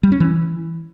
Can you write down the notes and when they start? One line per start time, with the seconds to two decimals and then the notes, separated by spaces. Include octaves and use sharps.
0.03 G3
0.12 C#4
0.20 E3